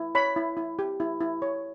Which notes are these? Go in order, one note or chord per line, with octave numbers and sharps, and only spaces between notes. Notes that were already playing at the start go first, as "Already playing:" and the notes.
Already playing: E4
C#5 B5
E4
E4
G4
E4
E4
C#5